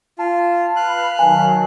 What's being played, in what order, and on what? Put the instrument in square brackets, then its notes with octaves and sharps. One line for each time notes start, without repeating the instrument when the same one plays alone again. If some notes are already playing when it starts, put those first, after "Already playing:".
[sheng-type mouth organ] F4 [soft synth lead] A5
[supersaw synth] B4 [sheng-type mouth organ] F5 F#6
[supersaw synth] D#3 F#3 [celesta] G#5